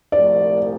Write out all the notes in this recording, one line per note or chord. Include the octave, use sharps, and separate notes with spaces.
C2 A#2 F3 A3 D5